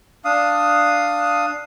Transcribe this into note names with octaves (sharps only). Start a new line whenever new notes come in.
D4 F5 D#6